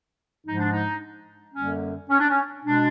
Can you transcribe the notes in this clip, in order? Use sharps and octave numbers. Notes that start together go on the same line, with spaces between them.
G#2 F3 G#3 D#4
D4
D#4
F#2 D3 G3 A#3 C#4
C#4
D4
C#4
B2 G#3 D4